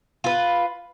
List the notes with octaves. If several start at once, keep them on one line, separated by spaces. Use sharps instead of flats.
F4 B4